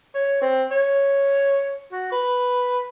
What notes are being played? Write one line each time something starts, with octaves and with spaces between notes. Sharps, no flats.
C#5
C4
C#5
F#4
B4